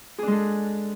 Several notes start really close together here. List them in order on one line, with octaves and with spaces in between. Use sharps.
G#4 D4 G#3 A4